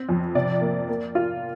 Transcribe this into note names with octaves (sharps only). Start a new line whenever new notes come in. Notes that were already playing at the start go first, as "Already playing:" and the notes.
Already playing: C4
F2
C3 D5
A#3
A#3
F4